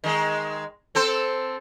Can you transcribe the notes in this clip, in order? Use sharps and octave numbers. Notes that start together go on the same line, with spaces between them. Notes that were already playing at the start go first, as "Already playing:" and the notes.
D#3 G#3
C4 A4 C5